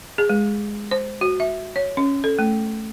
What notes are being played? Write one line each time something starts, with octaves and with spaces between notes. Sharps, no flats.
G#4
G#3
C5
F#4
E5
C#5
C#4
A4
A3